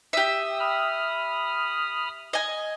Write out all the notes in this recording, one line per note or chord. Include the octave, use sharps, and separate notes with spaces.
G4 E5 D#6
B5 D#6 F6
D#5 G#5